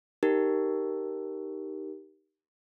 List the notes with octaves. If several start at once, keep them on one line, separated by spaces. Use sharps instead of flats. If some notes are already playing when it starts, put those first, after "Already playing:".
D#4 G4 A#4